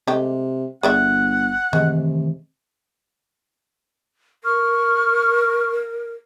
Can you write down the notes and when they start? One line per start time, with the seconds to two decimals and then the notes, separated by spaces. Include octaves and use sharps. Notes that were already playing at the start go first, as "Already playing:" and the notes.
0.07 C3 G#3 A3 G4
0.83 G1 G#4 D5 E5 F#5
1.73 C3 D#3 E3 G#3 A3
4.44 A#4 C#6 F6